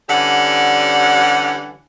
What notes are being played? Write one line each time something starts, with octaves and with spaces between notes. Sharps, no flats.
D3 E3 G3 C#4 G4 F#5